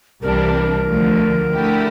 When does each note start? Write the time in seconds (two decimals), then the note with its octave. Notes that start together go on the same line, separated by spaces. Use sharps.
0.22 C2 C3 E3 G3 D4 A#4
0.88 D2 D3 F3 A3
1.55 D3 A3 E4 G4